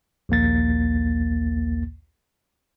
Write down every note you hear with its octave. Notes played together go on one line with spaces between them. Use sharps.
A#1 D#2 A#3 A6